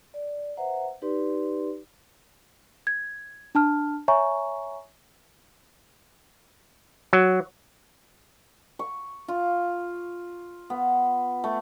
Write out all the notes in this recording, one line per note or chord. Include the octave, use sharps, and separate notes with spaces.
D5
B4 C5 E5 F#5 A#5
D#4 G4 B4 D5 C6
G#6
D4 A5 F6
C#5 E5 G#5 A#5 C#6
F#3
C#6
F4
B3
A3